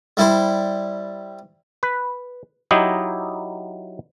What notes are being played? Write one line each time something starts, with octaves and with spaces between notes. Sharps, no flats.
G3 E4 C5
B4
F#3 D#4 E4 G4 D#5